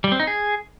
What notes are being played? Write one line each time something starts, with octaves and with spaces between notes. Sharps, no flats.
G3
C4
D#4
G#4